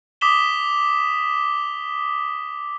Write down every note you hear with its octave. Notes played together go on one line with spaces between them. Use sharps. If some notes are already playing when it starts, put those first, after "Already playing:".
D6 D#6 B6 E7 G7